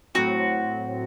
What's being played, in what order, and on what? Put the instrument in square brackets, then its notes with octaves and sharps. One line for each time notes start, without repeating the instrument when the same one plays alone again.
[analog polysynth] A2 F#3 C4 [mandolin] F#4